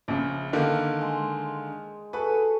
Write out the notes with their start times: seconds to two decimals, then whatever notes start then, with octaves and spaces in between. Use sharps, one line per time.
0.08 A#1 C#3
0.53 D3 D#3 A#3
1.01 G#3
2.13 F#4 G#4 A4 B4